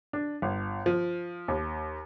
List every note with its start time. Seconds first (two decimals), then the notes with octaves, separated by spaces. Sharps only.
0.13 D4
0.42 G1
0.86 F3
1.48 D#2